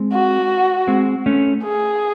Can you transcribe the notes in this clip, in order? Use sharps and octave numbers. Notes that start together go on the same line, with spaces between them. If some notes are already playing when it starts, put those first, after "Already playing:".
Already playing: G#3 C4
F#4
G#3 C4
A3 C#4
G#4